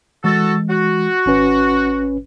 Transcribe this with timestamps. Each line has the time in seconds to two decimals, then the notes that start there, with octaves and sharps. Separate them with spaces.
0.24 E3 G#3 F#4 A4
0.69 F#4
1.26 G#1 C#4 B4